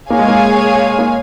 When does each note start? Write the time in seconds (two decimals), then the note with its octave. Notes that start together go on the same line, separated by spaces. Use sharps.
0.10 A#3 G#4 C#5 F5 G#5
0.19 G#3
0.28 A#3
0.99 A#3